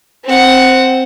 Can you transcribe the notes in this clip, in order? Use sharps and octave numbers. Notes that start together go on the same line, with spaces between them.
C4 F#5